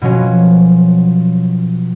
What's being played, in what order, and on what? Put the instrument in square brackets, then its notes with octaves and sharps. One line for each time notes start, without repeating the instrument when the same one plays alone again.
[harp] B2 F3 F#3 C#4 F#4